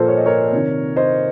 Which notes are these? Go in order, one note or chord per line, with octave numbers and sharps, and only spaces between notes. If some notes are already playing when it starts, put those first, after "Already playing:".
Already playing: A#2 F3 A4 A#4 C5
C#5
D#5
A#4 C#5
C3 D#3
C5 D#5